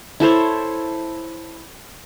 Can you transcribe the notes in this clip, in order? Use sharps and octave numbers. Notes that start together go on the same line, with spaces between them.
E4 A4 C5 C#5